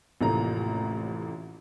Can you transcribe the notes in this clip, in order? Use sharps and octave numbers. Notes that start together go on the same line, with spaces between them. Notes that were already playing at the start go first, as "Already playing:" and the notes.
A1 F2 A2 C3 A#3 A#5